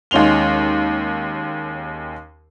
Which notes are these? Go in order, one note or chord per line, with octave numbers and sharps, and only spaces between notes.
D#2 G#3 C#4 C6 F7 G7